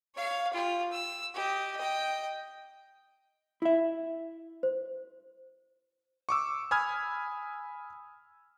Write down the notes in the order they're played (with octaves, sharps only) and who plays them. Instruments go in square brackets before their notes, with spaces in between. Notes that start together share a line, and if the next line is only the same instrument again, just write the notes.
[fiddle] C#5 F5
F4 G4
E6
G4 D#5
D#5 G5
[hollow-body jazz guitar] E4 E5
[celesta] C5
[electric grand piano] C#6 D6 E6
G#5 B5 D#6 F6 G#6